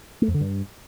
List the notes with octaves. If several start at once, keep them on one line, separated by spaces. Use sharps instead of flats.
A3
F2
D3
G2